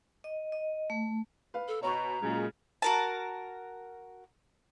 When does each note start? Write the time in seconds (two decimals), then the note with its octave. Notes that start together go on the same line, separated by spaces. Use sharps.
0.24 D#5
0.52 D#5
0.90 A3
1.54 B4 F5
1.68 A4
1.83 B2 C#5 A#5 C#6
2.22 A#2 C#3 F#3 G#3
2.82 F#4 A#4 A5